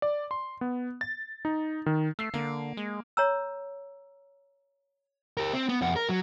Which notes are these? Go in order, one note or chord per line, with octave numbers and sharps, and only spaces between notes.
D5
C6
B3
A6
D#4
D#3
A3 E6 C7
D3 A#3
G#3
C#5 A#5 E6
G4 A#4
C4
B3
F2 F#5
A#4
F#3